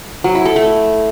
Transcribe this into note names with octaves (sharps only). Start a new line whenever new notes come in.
F#3
E4
A4
A3